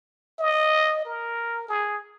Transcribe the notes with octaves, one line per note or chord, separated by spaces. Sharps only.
D#5
A#4
G#4